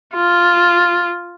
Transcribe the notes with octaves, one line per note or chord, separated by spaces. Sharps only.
F4